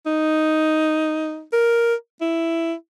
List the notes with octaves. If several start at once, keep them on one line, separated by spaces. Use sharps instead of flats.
D#4
A#4
E4